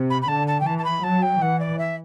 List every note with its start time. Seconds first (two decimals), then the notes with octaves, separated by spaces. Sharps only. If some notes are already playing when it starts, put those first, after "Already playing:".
Already playing: C3
0.10 B5
0.22 B5
0.28 D3 A5
0.47 A5
0.60 G5
0.66 E3 A5
0.78 A5
0.84 B5
1.03 F#3 A5
1.22 G5
1.41 E3 F#5
1.60 D5
1.79 E5